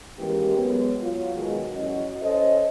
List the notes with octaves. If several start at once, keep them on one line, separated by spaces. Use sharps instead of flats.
D#3 E3 G#3 A#3 C#4 G4
B2 F#3 G#3 B3
F#3 F4
B2 D#3 F#3 G#3
F#2 F#3 C#4 E4 F#4 D#5
C#4 A4 C5 D#5